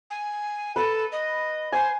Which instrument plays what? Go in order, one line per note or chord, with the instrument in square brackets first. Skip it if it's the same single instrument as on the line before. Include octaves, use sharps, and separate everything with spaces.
[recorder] G#5
[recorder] A4 [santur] B4 B5
[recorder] D#5
[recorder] C5 [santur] G#5